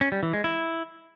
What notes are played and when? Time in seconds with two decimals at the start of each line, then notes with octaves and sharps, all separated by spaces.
0.01 C#4
0.12 G3
0.23 E3
0.33 G#3
0.44 E4